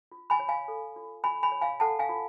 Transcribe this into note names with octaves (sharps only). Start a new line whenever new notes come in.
F4
G#5 B5
C#5
F5 G#5
A4
F4
F4 G#5 B5
G#5 B5
C#5
F5 G#5
A4 F#5 A5
F5 G#5
F4